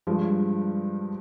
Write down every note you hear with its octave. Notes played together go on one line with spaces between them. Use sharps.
G2 F3 G#3